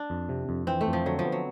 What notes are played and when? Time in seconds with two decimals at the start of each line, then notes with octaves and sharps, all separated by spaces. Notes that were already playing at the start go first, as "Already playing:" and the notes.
Already playing: D4
0.10 F2
0.29 C3
0.49 F2
0.67 E3 C4
0.81 A3
0.87 F2
0.93 F3
1.06 D3 F#3
1.19 F3
1.25 B3
1.32 F#3